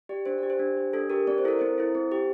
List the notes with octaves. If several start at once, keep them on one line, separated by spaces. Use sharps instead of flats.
G4 D5
D4 C5
G4 D5
C5
D4
G4
D4 A4
G4 A#4
C4 D5
C5
E4 A4 A#4
C4 C5
E4 A4
C4
G4